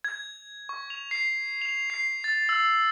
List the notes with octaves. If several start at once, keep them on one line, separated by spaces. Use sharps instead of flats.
G#6
C#6
F7
C7
F7
C7
A6
E6